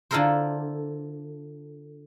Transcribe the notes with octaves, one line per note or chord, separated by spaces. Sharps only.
D3 E4 F4 A4 A#4 C5